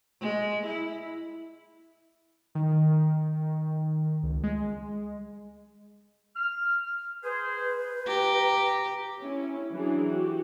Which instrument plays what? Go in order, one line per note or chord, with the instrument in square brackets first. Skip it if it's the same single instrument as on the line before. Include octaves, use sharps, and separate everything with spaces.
[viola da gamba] G#3
E4
[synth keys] D#3
C#2
G#3
[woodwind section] F6
[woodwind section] G#4 C5 [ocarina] B4
[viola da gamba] G4 [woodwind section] A#5
[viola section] C#4 E4
E3 F#3 D4 G#4
F#4 G4